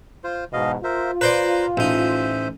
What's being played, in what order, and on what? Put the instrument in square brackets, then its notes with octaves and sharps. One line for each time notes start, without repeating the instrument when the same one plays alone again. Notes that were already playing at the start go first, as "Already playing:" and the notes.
[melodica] F4 C5
[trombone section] E2 G#2 B2 [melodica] D#5 F5
[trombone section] F4 [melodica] A#4 C5 E5
[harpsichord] B4 C5 D5 [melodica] A#5
[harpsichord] A1 D#4 [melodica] C5 E5